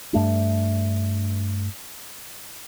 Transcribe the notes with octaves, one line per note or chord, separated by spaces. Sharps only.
G2 A3 D4